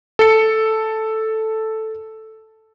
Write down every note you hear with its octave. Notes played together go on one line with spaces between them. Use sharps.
A4 C#7